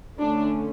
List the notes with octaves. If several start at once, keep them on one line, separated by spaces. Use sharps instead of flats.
D3 A3 C#4 D4